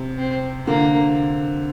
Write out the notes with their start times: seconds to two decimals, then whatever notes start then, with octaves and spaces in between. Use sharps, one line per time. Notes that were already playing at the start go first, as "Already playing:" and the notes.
Already playing: C3
0.18 C4
0.67 D3 A#3